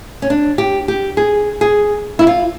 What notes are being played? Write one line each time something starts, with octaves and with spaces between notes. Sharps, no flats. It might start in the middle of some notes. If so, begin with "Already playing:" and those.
C#4
D4
G4
G4
G#4
G#4
E4
F4